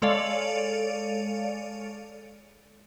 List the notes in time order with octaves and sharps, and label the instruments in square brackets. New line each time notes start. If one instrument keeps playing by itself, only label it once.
[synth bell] G#3 A4 C#5 D5 F5